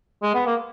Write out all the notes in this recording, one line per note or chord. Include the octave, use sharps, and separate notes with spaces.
G#3
B3
A#3